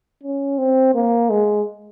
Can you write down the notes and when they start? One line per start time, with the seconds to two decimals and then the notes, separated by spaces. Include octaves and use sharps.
0.23 C#4
0.58 C4
0.94 A#3
1.30 G#3